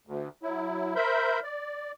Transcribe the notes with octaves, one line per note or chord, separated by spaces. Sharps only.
D2
F#3 E4
A#4 C5 E5 B5 G6
D5